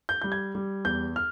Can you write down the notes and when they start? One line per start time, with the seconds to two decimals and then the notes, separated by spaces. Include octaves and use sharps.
0.09 G6
0.21 G3 G6
0.32 G#6
0.55 G3
0.85 E2 G6
1.16 F6